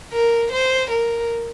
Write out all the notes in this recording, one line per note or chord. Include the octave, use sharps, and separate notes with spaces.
A#4
C5
A#4